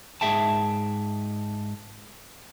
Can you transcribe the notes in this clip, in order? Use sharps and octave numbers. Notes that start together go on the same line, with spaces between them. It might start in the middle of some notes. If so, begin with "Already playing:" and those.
G#2 G#4 E5 G5 A5